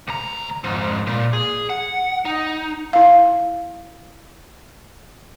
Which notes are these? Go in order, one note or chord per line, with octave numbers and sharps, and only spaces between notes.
D2 A#5
F2 G#2
A#2
G#4
F#5
D#4
E4 F5